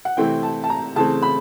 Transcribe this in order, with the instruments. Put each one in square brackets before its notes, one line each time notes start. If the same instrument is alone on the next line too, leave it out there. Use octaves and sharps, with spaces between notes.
[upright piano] F#5
C3 E3 A3 C4 E4 G5
A5
A5
A#5
C#3 E3 A3 C4 A5
B5